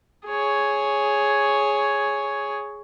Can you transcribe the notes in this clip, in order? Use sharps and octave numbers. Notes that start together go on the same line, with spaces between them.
G#4 C#5